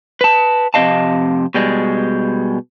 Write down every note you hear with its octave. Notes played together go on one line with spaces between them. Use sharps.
B4 A5
F2 C3 F#4 D#5 F5 A5
B2 G3 G#3